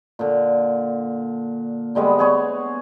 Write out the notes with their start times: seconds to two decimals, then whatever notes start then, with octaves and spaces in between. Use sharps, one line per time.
0.19 A#2 D3
1.95 D3 G3 G#3 B3
2.19 B3 G#4 C#5